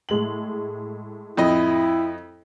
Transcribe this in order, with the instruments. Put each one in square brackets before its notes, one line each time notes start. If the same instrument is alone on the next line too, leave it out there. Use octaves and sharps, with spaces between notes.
[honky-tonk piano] A2 G#3 F#7
[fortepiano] F2 D#5 [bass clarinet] E4